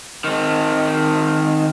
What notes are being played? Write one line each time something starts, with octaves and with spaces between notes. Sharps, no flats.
D#3 C4